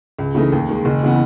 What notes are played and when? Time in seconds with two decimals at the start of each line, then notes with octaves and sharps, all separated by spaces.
0.19 C#2
0.35 C#3 E3 A3 D#4
0.52 D#2
0.69 D#3 G#3
0.85 F#1
1.03 C#3 E3 B3